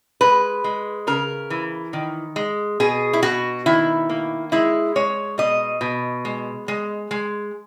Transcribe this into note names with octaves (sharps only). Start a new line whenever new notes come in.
G#3 B4
G#3
C#3 A#4
E3
D#3
G#3
B2 G#4
E4
B2 F#4
D#3 E4
A#3
G#3 E4
G#3 C#5
B2 D#5
B2
G#3
G#3
G#3